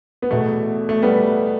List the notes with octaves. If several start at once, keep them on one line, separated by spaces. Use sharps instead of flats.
B3
E2 B2 A3
A3
G3 B3